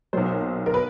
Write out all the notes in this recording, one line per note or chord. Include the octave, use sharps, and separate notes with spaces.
B1 A#2 F#3 C5
A#4
B4